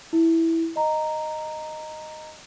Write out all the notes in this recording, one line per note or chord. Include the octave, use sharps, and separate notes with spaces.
E4
D#5 A#5